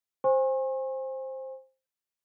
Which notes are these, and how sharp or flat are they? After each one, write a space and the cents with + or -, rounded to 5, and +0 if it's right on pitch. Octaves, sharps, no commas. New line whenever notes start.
C5 +10 G#5 -30 C#6 -45